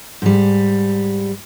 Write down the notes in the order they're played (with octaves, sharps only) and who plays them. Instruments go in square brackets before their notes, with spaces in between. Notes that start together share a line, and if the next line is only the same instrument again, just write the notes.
[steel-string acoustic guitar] G#2 G3